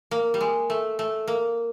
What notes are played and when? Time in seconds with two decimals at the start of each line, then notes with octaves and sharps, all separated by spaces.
0.11 A#3
0.34 G3
0.41 G#3
0.70 A3
0.99 A3
1.28 A#3